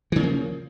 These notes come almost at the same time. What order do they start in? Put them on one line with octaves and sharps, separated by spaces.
E3 C#3 A#3 F3